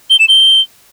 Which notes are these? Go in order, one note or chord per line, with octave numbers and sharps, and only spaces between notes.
G7
E7
G7